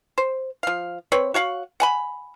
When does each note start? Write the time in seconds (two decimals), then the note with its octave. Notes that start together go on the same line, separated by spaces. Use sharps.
0.18 C5
0.63 F3 F5
1.12 C4 B4 C#5
1.34 F#4 C#5 F5 F#5
1.80 F#5 G#5 B5